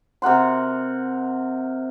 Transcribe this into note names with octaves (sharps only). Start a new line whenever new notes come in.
C3 A#4 F#5 C6